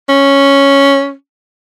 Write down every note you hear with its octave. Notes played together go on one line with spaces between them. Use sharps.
C#4